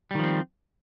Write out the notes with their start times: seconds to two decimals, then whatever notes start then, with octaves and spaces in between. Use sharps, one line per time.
0.11 G3
0.15 D#3
0.19 F3
0.23 C4